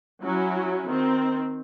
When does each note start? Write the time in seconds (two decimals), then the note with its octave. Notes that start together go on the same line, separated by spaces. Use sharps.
0.22 F#3 C#4 E4 F#4
0.87 D#3 C4